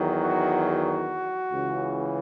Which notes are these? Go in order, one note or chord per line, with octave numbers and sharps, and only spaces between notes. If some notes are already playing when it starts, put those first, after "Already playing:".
Already playing: E2 D#3 F#3
F#4
F#4
C#2 C#3 E3